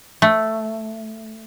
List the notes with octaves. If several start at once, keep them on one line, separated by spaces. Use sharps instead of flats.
A3